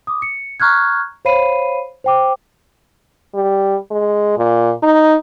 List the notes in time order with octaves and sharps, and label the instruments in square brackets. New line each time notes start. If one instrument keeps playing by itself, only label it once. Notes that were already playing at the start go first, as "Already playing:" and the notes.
[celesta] D6 D#6
C#7
A#5 C#6 F6 F#6 G#6
C5 C#5 F5 B5 C7 D#7
C5 G5 D6
[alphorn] G3
G#3
A#2
D#4